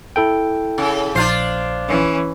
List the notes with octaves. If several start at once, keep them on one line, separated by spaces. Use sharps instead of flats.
E4 A4 G5
C#3
A#1 D4 F4 C5 C7
E3 C#4